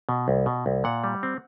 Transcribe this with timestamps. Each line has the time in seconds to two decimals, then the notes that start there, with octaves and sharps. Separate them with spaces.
0.09 B2
0.28 C2
0.46 B2
0.66 C2
0.84 A#2 F#5
1.04 G3
1.23 C4